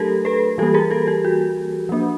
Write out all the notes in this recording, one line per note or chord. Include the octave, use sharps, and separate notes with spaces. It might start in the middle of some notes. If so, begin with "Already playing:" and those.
Already playing: F#3 A3 D4 G4 A4 A#4
A4 B4
E3 G3 A#3 G4 A4
G#4 A#4
G4 A4
G4
F#4
F3 A#3 D4